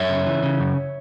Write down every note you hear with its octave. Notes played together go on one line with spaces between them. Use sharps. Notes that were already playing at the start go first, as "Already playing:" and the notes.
Already playing: F#2 C#5 E5
C#3
E3
C#3
F#2